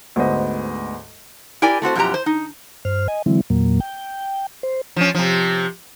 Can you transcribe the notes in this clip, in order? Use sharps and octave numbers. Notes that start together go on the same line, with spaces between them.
D2 G#2 B3 C5 D#5
E4 G4 A#4 D5 G#5
A3 C4 F#4 C5
F#2 B2 F3 E4 G4 A#5
C5
D#4
G2 C5 F6
D#5 G#5
D3 E3 F#3 G#3 C4 E4
E2 A#2 F#3 A#3
G5
C5
F3 C#4
C3 F3